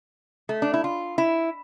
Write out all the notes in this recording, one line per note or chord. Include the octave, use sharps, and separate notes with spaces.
A3
D4
E4
F4
E4